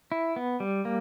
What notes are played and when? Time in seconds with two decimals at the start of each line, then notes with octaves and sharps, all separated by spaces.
0.12 E4
0.36 B3
0.60 G3
0.85 A#3